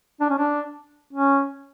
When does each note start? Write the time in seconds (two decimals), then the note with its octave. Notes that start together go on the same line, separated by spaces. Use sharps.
0.20 D4
0.30 C#4
0.38 D4
1.13 C#4